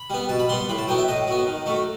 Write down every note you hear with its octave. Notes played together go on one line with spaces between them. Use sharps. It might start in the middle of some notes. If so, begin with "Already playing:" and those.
Already playing: B5
G3 B3
B2 A5
B5
G3 B3 C6
A2 B5
A5
F#3 B3 G5
E5
A2 D#5
F#3 B3
D#3
F#3 A3